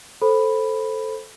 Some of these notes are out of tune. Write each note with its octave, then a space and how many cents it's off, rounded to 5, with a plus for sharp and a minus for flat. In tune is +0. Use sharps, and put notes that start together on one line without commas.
A4 +0 C5 +10 B5 +0